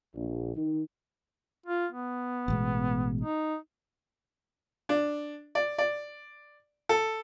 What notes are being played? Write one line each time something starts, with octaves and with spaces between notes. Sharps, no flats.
A#1
D#3
F4
B3
A1 B2 G#3
D#4
D4
D5
D5
A4